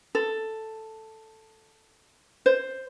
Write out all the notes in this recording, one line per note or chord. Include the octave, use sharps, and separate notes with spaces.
A4
C5